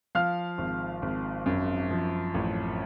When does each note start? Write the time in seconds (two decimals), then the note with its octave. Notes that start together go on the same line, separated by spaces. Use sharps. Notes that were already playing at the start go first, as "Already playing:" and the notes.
0.15 F3 F5 F6
0.58 G#1
1.02 G#1
1.46 F#2
1.91 F3
2.34 A1